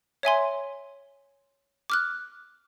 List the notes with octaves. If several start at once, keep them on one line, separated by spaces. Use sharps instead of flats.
C#5 E5 G#5 C6
D6 F6 F#6